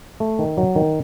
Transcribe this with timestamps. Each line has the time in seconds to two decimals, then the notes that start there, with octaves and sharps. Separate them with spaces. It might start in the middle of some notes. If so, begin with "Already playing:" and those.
0.20 A3
0.39 D#3
0.57 F#3
0.76 D#3